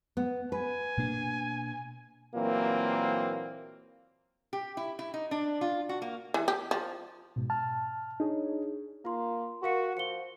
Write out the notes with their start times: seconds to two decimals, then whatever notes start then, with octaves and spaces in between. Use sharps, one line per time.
0.17 B3
0.52 B4 G#5
0.97 B2 A#3 D4
2.35 A#2 E3 F#3 A#3 C4
4.53 G4
4.77 E4
4.99 E4
5.14 D#4
5.31 D4
5.61 F4
5.89 F#4
6.02 A#3
6.34 E3
6.48 G4
6.71 F3
7.36 G#2 B2
7.50 A5 F6
8.20 D4 D#4 G#4 C#5
9.05 A#3 F4 C6
9.63 F#4 A#4 F5 C#7
9.97 F3 C#7 G7